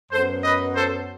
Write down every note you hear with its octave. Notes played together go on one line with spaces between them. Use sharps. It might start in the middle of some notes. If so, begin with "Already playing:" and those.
F#2 F#3 B3 A4 C5
B4 D#5
A4 C5